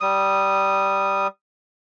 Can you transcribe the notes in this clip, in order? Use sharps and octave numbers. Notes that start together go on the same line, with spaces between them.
G3 D#6